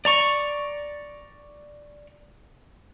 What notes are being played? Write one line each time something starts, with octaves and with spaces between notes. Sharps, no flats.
D5 A#5 C#6